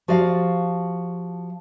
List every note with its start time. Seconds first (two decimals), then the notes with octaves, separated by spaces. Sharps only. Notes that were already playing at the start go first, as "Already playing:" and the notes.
0.08 F3 F#4 G4 D5 F5